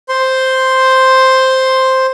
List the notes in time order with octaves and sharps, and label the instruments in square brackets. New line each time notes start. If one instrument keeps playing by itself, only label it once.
[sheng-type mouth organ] C5 C6